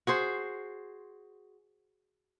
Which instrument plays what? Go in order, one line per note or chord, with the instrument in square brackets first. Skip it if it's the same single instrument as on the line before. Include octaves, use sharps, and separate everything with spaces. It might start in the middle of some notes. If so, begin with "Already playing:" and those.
[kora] F#4 G#4 C5